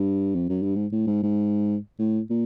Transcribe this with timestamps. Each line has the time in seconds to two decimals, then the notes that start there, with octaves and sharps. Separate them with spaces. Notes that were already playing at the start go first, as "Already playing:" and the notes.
Already playing: G2
0.35 F2
0.49 F#2
0.63 G2
0.76 G#2
0.92 A2
1.07 G#2
1.23 G#2
1.99 A2
2.30 A#2